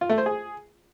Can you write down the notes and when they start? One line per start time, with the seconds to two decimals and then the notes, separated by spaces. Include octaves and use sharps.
0.01 F4
0.09 A3
0.18 C5
0.26 G#4